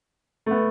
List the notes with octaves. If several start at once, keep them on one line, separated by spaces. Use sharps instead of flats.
A3
B3